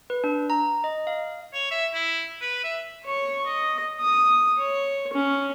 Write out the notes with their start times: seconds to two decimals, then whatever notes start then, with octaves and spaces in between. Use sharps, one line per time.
0.10 B4
0.24 D4
0.50 A#5
0.84 D#5
1.07 F5
1.54 C#5
1.71 E5
1.94 E4
2.41 B4
2.64 E5
3.04 C#5 C#6
3.47 D#5
4.01 D#6
4.59 C#5
5.13 C#4